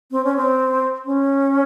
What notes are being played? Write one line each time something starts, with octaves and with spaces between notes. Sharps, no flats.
C4
C#4
C4
C#4